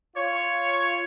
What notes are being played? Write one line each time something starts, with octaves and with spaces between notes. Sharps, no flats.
F4 C#5